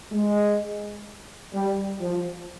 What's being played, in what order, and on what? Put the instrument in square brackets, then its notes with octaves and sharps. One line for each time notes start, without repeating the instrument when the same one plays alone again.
[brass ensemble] G#3
G3
F3